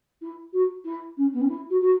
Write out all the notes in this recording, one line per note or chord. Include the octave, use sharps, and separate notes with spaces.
E4
F#4
E4
C#4
B3
C#4
E4
F#4
F#4